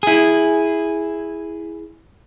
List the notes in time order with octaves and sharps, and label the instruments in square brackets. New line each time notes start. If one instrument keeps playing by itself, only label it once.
[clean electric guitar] E4 G#4